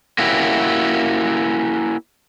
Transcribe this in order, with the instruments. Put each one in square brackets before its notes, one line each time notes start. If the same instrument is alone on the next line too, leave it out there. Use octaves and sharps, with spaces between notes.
[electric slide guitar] A#3 C#4 E4 F#4 G4